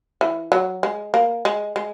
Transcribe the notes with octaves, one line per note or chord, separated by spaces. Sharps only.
E3
F#3
G#3
A#3
G#3
G#3